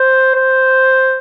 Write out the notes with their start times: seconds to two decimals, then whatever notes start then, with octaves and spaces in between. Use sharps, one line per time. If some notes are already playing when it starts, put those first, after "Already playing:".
Already playing: C5
0.35 C5